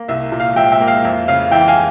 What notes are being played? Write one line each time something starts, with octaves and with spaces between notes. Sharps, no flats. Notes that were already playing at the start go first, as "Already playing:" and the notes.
Already playing: A#3
C2 E5
A#2
F5
F3 E5 G5
E5 G5
A#3
F5
F2 E5
C#3 F5
E3 E5 G5
F5 G#5